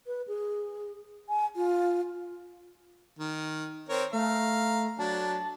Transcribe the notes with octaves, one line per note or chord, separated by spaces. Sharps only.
B4
G#4
G#5
F4
D#3
C4 A#4 C#5
A3 F5 A#5
F#3 D4 A5